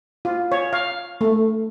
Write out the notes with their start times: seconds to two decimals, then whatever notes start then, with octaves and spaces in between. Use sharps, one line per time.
0.25 F4
0.52 C#5
0.73 F5
1.21 A3